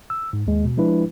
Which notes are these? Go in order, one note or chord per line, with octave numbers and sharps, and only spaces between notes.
E6
G#2
D#2 G#3
B2
F3 G#3 D4 E4 B4